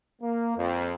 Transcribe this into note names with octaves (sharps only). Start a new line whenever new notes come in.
A#3
F2